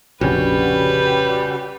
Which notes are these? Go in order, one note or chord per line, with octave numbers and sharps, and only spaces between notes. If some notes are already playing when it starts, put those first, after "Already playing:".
F1 A#1 C#3 G3 C#4 F#4 B4